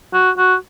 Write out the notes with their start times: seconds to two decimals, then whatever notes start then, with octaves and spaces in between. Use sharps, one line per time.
0.14 F#4
0.38 F#4